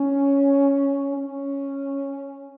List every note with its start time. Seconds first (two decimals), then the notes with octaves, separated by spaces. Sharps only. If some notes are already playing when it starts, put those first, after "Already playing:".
Already playing: C#4
1.18 C#4